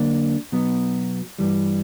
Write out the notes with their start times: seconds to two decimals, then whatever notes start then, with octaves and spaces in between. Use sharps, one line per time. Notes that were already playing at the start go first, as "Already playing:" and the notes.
Already playing: D3 F#3 A#3 D4
0.52 B2 F#3 B3
1.39 G2 E3 G3